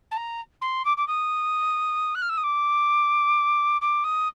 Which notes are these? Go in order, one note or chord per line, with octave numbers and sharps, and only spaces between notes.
A5
A#5
C6
D6
D6
D#6
F#6
F6
E6
D#6
D6
D6
D#6